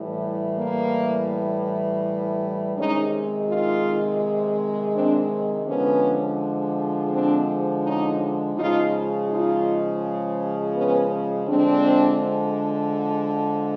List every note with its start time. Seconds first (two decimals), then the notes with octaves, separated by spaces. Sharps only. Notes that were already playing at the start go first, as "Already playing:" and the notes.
Already playing: A2 E3 G3
0.58 A#3
2.76 C3 D#3 G#3 C#4 D#4
3.49 D#4 F4
4.94 C4 D4
5.66 D3 F3 G#3 B3 C#4
7.11 C4 D4
7.84 C#4 D#4
8.56 C#3 F3 G#3 D#4 F4
9.29 D#4 F4
10.74 B3 C#4
11.47 D3 F3 G#3 C4 D4